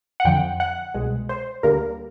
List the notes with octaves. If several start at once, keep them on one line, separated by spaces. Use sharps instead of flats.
F#5
F2 D3 F3 G5
F#5
C2 B2 G#3
C5
D2 D3 G3 A#3 A#4